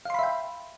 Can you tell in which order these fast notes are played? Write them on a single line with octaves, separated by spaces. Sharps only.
F5 C6 B5 E5 G5